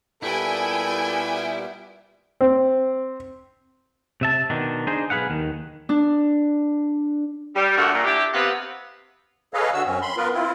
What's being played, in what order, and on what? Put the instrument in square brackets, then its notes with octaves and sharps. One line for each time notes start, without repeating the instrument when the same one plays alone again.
[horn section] A#2 G3 B3 [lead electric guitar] E4 [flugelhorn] A4 [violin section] G5 G#5
[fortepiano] C4
[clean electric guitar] C3 E5 A5
B2 D#3 D4
D4 D#4 G#4 C5
B1 G#4 B4 F5 F#5
D#2 D#3
[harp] D4
[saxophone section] G3
D3 A3 A#3 F#4 A#4
A#2
D4 E4 G4
C3 B3 C4 F5 F#5
[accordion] G#4 A4 B4 C#5 D#5 F5
D3 F#4 E6
F#2 C4 C#4
B5 C6
B3 F4 A#4 B4
C4 E4 F4